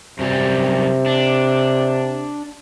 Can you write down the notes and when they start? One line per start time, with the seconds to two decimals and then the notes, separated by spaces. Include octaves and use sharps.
0.19 F#2 C3 G3
1.06 D4